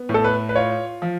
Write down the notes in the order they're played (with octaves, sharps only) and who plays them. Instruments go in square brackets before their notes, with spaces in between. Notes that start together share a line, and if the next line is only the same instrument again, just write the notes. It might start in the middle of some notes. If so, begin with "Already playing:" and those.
Already playing: [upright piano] B3
A2
[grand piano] A4
B4
B4
[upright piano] F4 [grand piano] C#5
[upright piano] F3